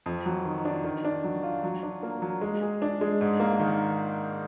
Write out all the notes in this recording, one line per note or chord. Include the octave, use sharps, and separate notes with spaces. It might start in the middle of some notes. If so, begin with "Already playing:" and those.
F2
F#3
D#3
D4
D#3
D4
F#3
F4
F#3
D4
A#3
F#3
G#3
G#4
D4
G#3
G#2
A#3
D#3